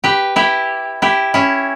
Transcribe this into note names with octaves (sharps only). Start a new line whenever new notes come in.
G4 B4
E4 G4
E4 G4
C#4 E4